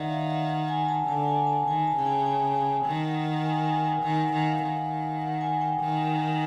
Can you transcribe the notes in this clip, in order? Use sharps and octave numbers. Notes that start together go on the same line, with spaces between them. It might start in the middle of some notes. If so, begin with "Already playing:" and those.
Already playing: D#3 D5 E5 F#5
F5
F#5
F#5
G#5
A5
D3 A5
G#5
A5
D#3 G#5
A5
C#3 G5
G#5
G#5
G#5
D#3 G5
F#5
F#5
G#5
G#5
G#5
D#3 G#5
F#5
D#3 F#5
F5
D#3
F#5
G#5
G5
D#3